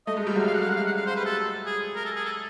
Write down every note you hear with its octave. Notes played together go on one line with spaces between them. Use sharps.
A3 D#5
G#3
G3
F#3 G#3
F5
F#5
F5
F#5
F5
F#5
F5
C5
B4
A4
G#4
A#4
A4
G#4
A4